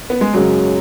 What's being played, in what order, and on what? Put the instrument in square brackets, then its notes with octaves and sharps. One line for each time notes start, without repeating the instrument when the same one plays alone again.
[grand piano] B3
G#3
[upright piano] F#2 C#3 G#3 C#4 F#4 [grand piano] F#3